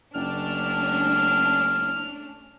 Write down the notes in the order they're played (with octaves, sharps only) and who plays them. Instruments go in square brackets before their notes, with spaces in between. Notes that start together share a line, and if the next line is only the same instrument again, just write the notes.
[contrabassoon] F#1 [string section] A3 C#4 D4 [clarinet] F6